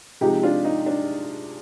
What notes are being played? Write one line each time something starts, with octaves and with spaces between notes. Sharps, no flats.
C3 F3 G#3 D#4 G4
D4 F4
D#4
D4